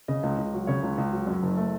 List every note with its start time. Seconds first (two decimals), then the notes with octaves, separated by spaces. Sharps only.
0.08 C#3 D#5
0.23 C#2
0.38 C#2
0.53 F#3
0.67 C#3 C#5
0.83 C#2
0.98 C#2
1.12 F#3
1.27 F#2
1.43 F#1
1.57 A3